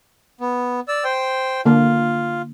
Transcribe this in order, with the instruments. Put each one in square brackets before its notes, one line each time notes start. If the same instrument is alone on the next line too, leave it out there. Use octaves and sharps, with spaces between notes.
[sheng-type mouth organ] B3
D5 E6
C5 G5
[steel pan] D3 A#3 [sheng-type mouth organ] F4